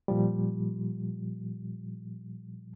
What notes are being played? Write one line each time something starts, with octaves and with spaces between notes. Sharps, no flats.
A#2 F3 G3